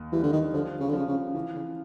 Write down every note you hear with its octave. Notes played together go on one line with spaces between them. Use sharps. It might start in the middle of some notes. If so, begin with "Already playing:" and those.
Already playing: D#2
E3 G3
D3
D#3
D3 F3
C#3
D3
C#3 F3
C#3
C#3 E3
C#3